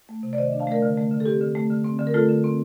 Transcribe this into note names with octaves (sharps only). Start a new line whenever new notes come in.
A3
C3
D5
D#3 C5 D#5
D4
F5 A5
A3 A#4 D5
D3
A3
D3
A4
C4 G4
D3
A3
D3
C4
D3
A#4
A3 F4 A4
D3
C4